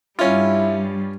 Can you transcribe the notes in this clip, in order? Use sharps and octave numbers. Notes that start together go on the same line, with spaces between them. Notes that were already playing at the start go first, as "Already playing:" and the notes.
G2 G3 C#4 E4 F4